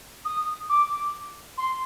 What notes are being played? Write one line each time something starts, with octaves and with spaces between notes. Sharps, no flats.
D#6
D6
C6